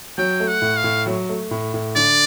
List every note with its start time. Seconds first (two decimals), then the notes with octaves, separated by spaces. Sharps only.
0.18 F#3 G5
0.40 A3
0.48 F#5
0.62 A2
0.77 F5
0.84 A2
1.06 F#3
1.29 A3
1.51 A2
1.74 A2
1.96 D3 D5